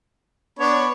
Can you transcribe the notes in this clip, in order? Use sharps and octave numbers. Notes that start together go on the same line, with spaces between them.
B3 D4 C#5 B5